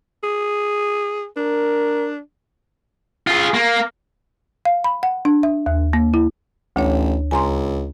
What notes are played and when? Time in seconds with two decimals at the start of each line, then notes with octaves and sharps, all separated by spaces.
0.23 G#4
1.37 D4 A#4
3.27 F4 G#4
3.54 A#3
4.65 F5
4.84 B5
5.03 F#5
5.25 D4
5.43 E5
5.66 D#2
5.93 A#3
6.14 E4
6.76 A1 D2 D4 C#5
7.31 C#2 G#5 A#5 C6